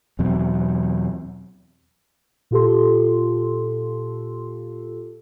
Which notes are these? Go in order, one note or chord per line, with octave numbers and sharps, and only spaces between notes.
E2 B2 F#3 C4
A#2 F4 G4 A4 C6